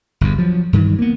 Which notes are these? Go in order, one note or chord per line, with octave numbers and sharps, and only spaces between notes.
G1 E2
F3 F#3
G2 D#3 E3
A#3 B3